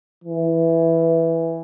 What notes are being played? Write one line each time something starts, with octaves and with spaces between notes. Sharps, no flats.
E3